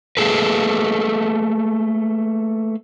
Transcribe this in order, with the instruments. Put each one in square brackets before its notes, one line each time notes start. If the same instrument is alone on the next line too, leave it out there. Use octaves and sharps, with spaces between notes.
[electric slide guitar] A3 A#3 G#4 A4 B4